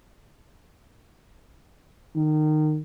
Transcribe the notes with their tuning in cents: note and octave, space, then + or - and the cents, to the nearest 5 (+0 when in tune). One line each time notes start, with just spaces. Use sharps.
D#3 -25